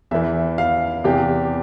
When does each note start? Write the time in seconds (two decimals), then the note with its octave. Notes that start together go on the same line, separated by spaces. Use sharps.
0.11 E2 E3 E5
0.58 F5
1.04 E2 C3 E3 G4